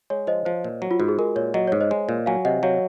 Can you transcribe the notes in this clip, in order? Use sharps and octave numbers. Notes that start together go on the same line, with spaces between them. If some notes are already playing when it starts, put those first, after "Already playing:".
G#3 C#5
F3 C5 D#5
F3 C5
A#2
F#3
F4
G#2 F#4
G#4
G#3 A#4
A#2 C#5
F#3 D#5
G#2 C#5
C5 D#5
G#3
A#2
F#3 F5 G#5
C3 D#5 F#5
F#3 C#5 F5